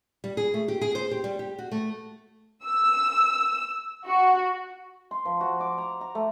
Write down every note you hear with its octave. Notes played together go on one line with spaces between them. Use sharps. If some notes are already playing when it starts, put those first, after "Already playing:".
G3
G#4
A3
G4
G#4
C5
G4
G3
G4
F#4
A3
E6
F#4
C6
F3
F#4
D6
A#5
A#5
A3